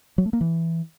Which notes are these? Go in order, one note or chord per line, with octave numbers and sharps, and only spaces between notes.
F#3
A3
A#3
E3